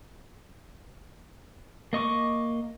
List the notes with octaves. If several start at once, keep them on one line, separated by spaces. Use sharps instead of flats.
A#3 D#5 C#6 D6